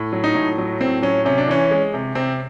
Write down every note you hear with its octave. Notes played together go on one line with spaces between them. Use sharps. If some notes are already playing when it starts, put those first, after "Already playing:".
Already playing: A2
F#3
D#4
A2
F#3
A2 C4
F#3 C#4
C3 C#4
D4
E3 C#4
G#3
C3
C3 C4